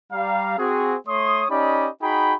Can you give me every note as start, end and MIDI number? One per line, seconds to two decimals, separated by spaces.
0.12 0.58 55
0.12 0.58 77
0.12 0.58 82
0.58 0.95 60
0.58 0.95 66
0.58 0.95 68
1.07 1.45 57
1.07 1.45 73
1.07 1.45 84
1.07 1.45 87
1.50 1.88 61
1.50 1.88 63
1.50 1.88 67
1.50 1.88 74
1.50 1.88 75
1.50 1.88 83
2.02 2.34 63
2.02 2.34 66
2.02 2.34 68
2.02 2.34 79
2.02 2.34 83